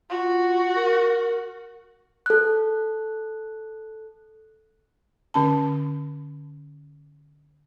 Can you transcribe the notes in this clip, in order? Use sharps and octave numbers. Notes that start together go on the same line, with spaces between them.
F4 F#4
A#4
A4 F#6
D3 C#4 A5